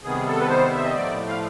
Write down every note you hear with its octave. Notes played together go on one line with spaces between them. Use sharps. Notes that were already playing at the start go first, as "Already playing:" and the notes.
C3 D#3 G3 B3 G#4
A4
B4
C5
E5
D#5
A2 F3 A3 D5
F5